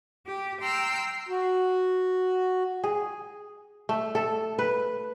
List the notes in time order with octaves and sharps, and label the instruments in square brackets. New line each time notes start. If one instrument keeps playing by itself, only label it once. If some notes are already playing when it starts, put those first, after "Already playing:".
[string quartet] G4
G5 A#5 C6 E6 F6 G6
[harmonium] F#4
[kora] G#4
A3
A4
B4